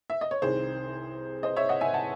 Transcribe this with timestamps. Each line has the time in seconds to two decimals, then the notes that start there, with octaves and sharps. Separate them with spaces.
0.10 E5
0.21 D#5
0.31 C#5
0.42 C2 C3 D#3 G#4 C5
1.43 C5 D#5
1.56 C#5 E5
1.69 D#5 F#5
1.81 E5 G#5
1.94 F#5 A5